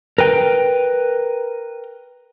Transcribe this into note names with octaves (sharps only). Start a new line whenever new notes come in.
A#4 B4 G5